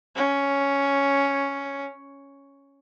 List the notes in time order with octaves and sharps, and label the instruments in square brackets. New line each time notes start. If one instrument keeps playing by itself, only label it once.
[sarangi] C#4